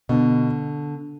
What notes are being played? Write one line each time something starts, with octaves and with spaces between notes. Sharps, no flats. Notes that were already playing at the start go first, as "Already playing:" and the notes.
B2 D3